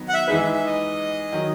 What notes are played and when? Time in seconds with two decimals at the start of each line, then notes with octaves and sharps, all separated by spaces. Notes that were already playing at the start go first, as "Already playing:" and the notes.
Already playing: D#3 F#3 B3
0.08 F#5
0.14 E5
0.27 E3 G#3 D#4 G#4 B4 E5
0.40 E5
0.53 E5
0.66 D#5
1.32 D#3 F#3